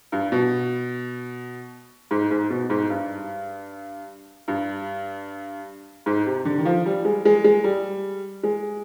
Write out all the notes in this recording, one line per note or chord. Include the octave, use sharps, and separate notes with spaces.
G2
B2
G#2
G#2
B2
G#2
G2
G2
G#2
C3
D3
D#3
F3
G3
G#3
G#3
G#3
G3
G#3